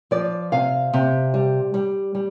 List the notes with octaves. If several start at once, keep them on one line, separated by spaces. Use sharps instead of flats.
F3 D5
C3 F5
C3
G3
G3
G3